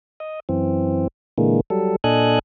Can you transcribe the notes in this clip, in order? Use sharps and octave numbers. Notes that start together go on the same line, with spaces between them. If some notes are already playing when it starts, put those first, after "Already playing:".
D#5
F#2 E3 C4
A#2 D3 E3 G#3 A#3
F#3 G3 A4
A#2 D4 A4 D#5 G#5 F#6